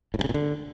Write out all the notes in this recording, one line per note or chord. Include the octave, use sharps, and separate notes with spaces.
A2
G2
C#3
A#2
D3